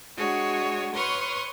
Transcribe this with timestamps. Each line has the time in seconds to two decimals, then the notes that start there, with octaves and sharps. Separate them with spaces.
0.17 G#3 D4 F#4 G#4 C#5
0.94 B4 C#5 C6 C#6 D#6 F6